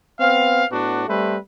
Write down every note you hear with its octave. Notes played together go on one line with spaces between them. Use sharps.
B3 C4 F5
A2 B3 D4 F#4
G3 A3 C4 B4